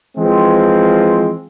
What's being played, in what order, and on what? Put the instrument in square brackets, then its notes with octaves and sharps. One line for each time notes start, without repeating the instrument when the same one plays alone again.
[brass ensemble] E3 F3 G#3 C4